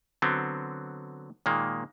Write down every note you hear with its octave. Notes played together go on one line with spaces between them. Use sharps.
D3 F#3 B3 C4
A#2 D#3 G#3 A#3